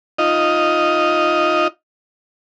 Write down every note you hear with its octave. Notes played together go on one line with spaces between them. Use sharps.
D#4 F4 D#5